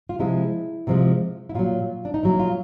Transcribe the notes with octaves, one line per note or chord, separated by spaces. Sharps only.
F4
C3 F3 G#3 E4
C3 F3 G#3
E4
A#2 F#3 F4
D4
D#4
A#2 F#3 E4
F4